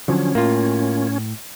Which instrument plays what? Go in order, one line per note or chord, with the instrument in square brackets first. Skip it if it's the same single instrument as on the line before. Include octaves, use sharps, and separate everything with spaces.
[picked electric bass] D3 F3 F#3 [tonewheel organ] C#4
[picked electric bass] A2 [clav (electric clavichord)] A#3 F4